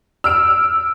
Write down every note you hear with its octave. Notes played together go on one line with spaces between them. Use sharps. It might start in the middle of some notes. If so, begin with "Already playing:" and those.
E6 F6 D7